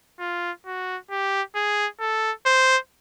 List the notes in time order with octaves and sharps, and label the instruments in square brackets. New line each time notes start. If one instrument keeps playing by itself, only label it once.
[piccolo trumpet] F4
F#4
G4
G#4
A4
C5